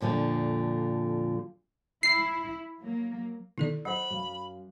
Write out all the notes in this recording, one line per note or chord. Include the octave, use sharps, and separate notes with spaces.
F2 A#2 D3 F3
E4 C7
F#3 A#3
B2 D#3 E4 A4 D5
F#3 C5 F#5 B5
F#2 F5